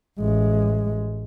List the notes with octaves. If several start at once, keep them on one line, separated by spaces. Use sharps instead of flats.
A1 G#3